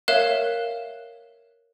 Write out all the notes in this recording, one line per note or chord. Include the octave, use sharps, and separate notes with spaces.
A#4 C#5 E5 F5 F#6 E7